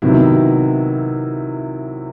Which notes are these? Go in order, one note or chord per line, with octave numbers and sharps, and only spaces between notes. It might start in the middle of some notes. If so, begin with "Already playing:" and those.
C3 D#3 F#3 B3 E4